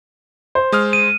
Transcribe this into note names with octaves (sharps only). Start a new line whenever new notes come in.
C5
G#3 D#6 F6
D#7